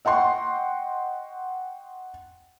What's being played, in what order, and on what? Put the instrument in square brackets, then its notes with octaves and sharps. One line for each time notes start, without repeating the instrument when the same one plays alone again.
[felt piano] D#5 F#5 G5 C6 C#6